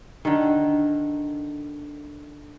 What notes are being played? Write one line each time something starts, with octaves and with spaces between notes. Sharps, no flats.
D3 D#3